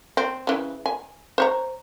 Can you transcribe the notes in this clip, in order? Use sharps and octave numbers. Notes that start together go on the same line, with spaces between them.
C4
C#3 E3
G#5
C5 C#5 A#5